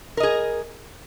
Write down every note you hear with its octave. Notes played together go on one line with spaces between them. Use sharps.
G#4 A#4 D#5